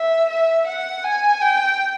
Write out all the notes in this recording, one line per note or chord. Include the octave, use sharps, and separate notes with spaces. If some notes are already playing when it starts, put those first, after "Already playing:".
Already playing: E5
E5
F#5
G#5
G5